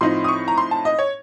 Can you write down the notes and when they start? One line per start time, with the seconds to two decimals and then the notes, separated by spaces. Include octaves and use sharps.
0.01 A2 F3 C4 D#4 C6
0.24 D#6
0.28 C#6
0.48 A#5
0.58 C6
0.71 A5
0.85 D#5
0.99 C#5